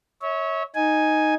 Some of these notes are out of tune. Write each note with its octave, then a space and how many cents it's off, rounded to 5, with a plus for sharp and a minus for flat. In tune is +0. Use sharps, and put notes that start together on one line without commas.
C#5 +0 E5 -35
D#4 +0 G#5 +0